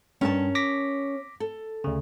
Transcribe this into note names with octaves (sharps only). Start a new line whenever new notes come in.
G2 C#4 A#4 A5
D6 A#6 B6
A4
D2 C#3